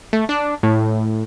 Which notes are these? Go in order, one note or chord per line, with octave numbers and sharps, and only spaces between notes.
A3
D4
A2